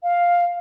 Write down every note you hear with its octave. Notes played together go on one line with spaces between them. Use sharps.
F5